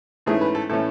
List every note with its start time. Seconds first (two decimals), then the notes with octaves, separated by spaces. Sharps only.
0.26 G#2 E3 A3 C#4 G#4
0.41 B4
0.55 A4
0.70 A2 E3 A3 C#4 A4